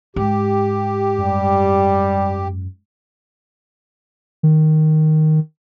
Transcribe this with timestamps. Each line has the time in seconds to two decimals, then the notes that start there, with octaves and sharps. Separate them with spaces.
0.16 G#2 G4
1.18 F#2 G3
4.43 D#3